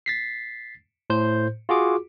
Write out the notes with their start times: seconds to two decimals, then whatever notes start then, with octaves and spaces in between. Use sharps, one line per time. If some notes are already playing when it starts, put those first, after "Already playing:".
0.06 A6 B6 C7
1.10 A2 C5 G6
1.69 F4 F#4 G#4 D6